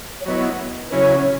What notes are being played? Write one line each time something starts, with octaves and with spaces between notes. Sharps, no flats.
C#5
F#3 B3 E4 D#5
B4
C#3 F#3 C#4 E4 C#5